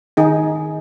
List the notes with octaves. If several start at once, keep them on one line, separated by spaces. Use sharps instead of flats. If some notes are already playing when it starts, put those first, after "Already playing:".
D#3 D#4 G#4